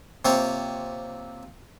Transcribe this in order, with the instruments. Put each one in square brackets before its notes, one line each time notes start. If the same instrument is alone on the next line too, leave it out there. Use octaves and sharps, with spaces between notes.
[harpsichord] C3 A#3 C4 F4 C#5